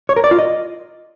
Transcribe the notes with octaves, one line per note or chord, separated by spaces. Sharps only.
C#5
A#4
D5
F4
D#5